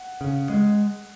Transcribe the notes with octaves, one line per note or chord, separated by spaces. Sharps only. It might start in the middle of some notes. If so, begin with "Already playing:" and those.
Already playing: F#5
C#3
G#3